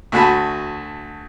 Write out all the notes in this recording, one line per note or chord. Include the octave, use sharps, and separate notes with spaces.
D2 A3 F#4 G#5 A5 B5